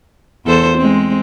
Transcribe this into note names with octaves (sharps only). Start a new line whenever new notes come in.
E2 A4 C5
G#3 C4